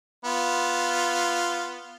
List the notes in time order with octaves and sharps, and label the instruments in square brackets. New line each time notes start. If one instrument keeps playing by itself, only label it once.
[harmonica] B3 F4